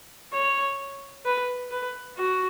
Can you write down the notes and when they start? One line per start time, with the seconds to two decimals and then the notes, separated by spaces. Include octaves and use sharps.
0.33 C#5
1.25 B4
1.71 B4
2.17 F#4